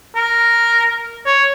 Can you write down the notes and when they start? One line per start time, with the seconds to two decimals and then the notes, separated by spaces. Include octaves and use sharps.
0.16 A#4
1.26 C#5